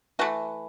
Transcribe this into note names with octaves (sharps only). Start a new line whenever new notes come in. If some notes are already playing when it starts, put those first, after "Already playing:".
E3 A3 F#4